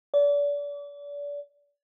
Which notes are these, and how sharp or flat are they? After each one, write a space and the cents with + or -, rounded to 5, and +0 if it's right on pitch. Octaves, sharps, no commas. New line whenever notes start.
D5 -35